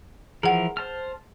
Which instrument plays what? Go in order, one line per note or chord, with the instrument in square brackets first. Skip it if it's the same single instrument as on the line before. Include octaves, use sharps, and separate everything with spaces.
[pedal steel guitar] E3 F3 A#4 [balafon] G#4 F#5
[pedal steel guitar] C5 A5 F6